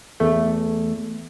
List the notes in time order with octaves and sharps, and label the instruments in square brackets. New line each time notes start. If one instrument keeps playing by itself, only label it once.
[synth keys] E2 A3